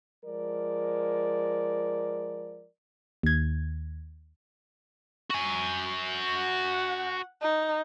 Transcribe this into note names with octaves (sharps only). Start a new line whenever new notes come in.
F3 G#3 A#4 D5
D#2 G#6
F#4 G#5
F#5
D#4